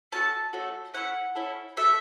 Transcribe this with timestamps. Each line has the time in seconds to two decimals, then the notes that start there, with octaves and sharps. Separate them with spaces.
0.12 A3 C#4 F#4 A4 A5
0.53 A3 C#4 F#4 A4
0.94 C#4 E4 A4 F#5
1.35 C#4 E4 A4
1.77 A3 F#4 A4 E5